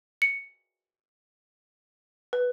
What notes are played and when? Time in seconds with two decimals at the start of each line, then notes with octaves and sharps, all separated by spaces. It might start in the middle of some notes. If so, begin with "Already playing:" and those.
0.22 C#7
2.33 B4